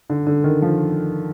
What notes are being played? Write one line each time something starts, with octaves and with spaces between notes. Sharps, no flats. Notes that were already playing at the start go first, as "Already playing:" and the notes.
D3
D3
D#3
F3